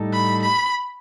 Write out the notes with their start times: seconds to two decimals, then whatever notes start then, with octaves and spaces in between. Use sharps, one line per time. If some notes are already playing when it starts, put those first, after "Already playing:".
Already playing: A2 G3 D#4 A4
0.13 B5
0.42 B5